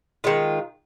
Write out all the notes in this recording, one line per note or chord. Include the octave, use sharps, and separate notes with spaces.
D#3 G#3 F4